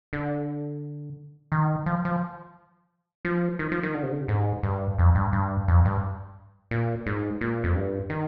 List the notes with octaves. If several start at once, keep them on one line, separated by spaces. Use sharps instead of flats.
D3
D#3
F3
F3
F3
D#3
F3
D#3
D3
C3
D3
C3
G#2
G2
F2
G2
G2
F2
G2
A#2
G#2
A#2
F2
G2
D#3